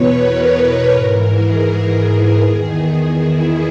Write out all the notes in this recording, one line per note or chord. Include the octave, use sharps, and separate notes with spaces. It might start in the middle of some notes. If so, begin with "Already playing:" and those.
Already playing: E2 B2 B4 C#5
A#4
B4
G#2 E3 A#4
G#4
E2 D#3
E4